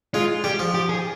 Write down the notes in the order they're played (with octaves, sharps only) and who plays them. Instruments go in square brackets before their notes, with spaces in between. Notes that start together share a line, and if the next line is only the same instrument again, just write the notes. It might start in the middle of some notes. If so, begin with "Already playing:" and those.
[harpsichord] G#3 [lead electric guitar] F4
[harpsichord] G3 [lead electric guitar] G4
[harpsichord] F3
[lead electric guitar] G4
G#4